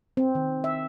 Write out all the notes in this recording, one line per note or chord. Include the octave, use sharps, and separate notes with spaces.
C4
D#3
E5